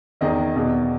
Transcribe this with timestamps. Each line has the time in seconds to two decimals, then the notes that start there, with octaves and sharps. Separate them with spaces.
0.21 E2 D#3 D#5
0.56 E2 B2